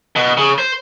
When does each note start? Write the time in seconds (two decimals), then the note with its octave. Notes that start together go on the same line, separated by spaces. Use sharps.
0.16 B2
0.37 C#3
0.58 C5